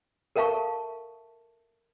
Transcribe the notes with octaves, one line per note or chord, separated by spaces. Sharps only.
A4 A#4 E5 F5 A5 C#6